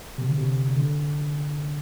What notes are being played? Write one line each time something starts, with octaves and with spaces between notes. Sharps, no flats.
C3
D3
C3
D3